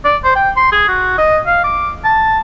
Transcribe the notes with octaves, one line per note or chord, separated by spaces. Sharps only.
D5
C5
G5
C6
G#4
F#4
D#5
F5
D6
A5